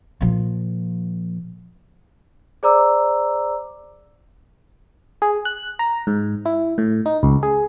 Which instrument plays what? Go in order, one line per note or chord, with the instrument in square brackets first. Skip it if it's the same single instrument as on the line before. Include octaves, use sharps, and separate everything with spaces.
[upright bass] A#2 F3
[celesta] G#4 C5 D5 A#5 D6 E6
[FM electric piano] G#4
F#6
A#5
G#2
E4
A2
D#4
C#2
G#4